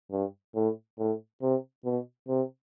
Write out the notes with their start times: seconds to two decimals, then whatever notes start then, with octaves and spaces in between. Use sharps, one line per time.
0.11 G2
0.55 A2
0.99 A2
1.42 C3
1.85 B2
2.29 C3